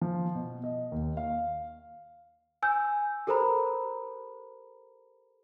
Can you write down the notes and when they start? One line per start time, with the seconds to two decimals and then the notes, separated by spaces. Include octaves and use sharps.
0.01 F3
0.35 B2
0.64 D#5
0.92 D#2
1.17 F5
2.63 G#5 E6 G6
3.27 G4 A4 A#4 C5 A#5 B5